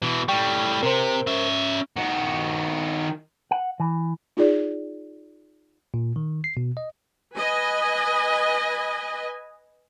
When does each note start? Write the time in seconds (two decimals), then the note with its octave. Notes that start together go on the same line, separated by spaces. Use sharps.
0.02 B2 E3
0.28 A2 G3 G5 C#6
0.83 C3 A#4 C5
1.27 C#4 E5
1.96 D#3 F#4
3.51 F#5
3.80 E3
4.37 D#4 F4 G#4 D5
5.94 A#2
6.16 D#3
6.44 C7
6.57 B2
6.77 D#5
7.37 B4 D#5 G#5